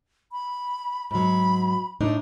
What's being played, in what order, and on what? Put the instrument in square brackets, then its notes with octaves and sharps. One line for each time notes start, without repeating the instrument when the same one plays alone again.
[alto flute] B5
[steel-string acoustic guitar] G#2 F#3 [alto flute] B5
[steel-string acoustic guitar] A2 D4 D#4